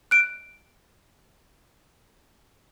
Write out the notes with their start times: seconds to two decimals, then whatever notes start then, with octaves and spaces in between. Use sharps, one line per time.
0.11 F#6 D7